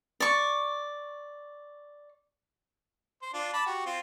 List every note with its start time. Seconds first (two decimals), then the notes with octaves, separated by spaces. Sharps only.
0.20 D5 C#6
3.22 C5
3.34 D4 F4
3.53 A5 B5 D6
3.66 F#4 G4
3.86 C4 F4